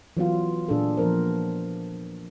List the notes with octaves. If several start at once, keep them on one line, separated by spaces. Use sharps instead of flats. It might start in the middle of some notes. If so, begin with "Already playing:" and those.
E3 F#3 B3 F4
A#2 D4 G#4 A4
F3 B3 A#4 C5